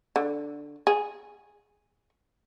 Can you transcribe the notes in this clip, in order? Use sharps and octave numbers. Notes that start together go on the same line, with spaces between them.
D3
G#4